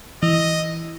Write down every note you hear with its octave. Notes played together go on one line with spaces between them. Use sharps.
E3 D#5